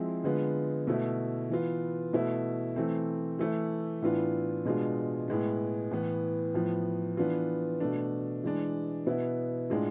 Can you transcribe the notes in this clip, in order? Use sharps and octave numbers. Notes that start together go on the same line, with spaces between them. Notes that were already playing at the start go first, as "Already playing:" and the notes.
Already playing: F3 G#3 C4 E4
D3 G#3 B3 F4
B2 A3 E4
E3 B3 F4
B2 A3 E4
E3 A3 C4
E3 A3 E4
A2 E3 B3 D4 F4
B2 G#3 D4 F4
A2 G#3 B3
A2 E3 B3
A2 F3 B3
E3 B3 D4 F4
B2 A3 D4
E3 G#3 D4
B2 B3 E4
A2 G#3 D4 F4